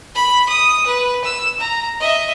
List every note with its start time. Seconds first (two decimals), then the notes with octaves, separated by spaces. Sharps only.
0.15 B5
0.49 D#6
0.86 B4
1.24 E6
1.60 A#5
2.00 D#5 E5